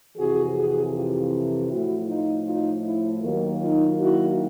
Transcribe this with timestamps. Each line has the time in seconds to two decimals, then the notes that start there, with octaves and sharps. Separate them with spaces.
0.17 F2 C3 E3 F#4 G#4
0.55 F#4 G#4
0.94 F4 G4
1.69 A2 F3 A3 E4 F#4
2.07 D#4 F4
2.45 D#4 F4
2.84 E4
3.22 D#2 D#3 F#3 A#3
3.60 D#4 F4
3.98 E4 F#4